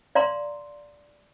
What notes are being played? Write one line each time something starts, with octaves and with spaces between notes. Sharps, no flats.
D5 F5 A#5 C6